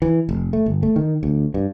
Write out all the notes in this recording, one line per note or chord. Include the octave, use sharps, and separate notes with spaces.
E3
F1
A3
G1
A3
D#3
D2
G2